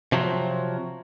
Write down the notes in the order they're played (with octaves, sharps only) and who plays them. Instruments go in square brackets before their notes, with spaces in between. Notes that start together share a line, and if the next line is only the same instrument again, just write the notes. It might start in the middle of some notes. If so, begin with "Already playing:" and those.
[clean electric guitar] C3 F3 F#3